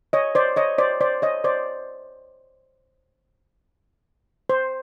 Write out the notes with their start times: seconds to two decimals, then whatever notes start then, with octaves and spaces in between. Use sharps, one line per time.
0.13 C#5 D#5
0.35 C5 D5
0.56 C#5 D#5
0.78 C5 D5
1.01 C5 D5
1.22 C#5 D#5
1.44 C5 D5
4.49 C5